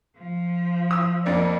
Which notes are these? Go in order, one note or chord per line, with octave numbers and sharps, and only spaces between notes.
F3
D#6 E6
F2 A#3 D5